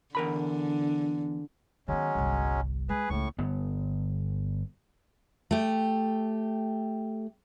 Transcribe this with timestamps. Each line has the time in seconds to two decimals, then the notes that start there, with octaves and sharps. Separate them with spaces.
0.15 E2 D3 A#4 B5
1.88 D#3 F#3 G#3 B3 C#4
2.15 G1 C2
2.89 G#3 G#4 B4
3.10 C#2 A2 A3 C#6
3.38 G1 B3
5.51 A3 G4